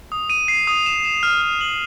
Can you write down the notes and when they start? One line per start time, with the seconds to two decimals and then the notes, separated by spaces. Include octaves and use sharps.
0.12 D#6
0.30 D#7
0.48 C7
0.67 D#6
0.86 E7
1.05 E7
1.23 F6
1.42 F6
1.61 F#7